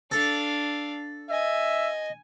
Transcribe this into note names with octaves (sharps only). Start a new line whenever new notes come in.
D4 A4 F5
D#5 E5 G#5